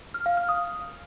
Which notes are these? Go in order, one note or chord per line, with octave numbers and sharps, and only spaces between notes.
F6
F5
F6
D#6